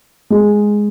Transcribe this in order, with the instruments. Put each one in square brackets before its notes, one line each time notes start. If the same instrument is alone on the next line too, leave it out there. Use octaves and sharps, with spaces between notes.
[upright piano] G#3